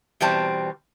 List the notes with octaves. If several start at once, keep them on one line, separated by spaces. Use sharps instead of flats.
E2 B2 G3 C4 A5